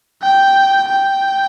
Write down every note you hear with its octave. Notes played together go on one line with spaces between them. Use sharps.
G5
G5